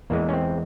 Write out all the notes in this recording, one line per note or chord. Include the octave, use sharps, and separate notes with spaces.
E2 E3 G#3 A#3
C#4
C4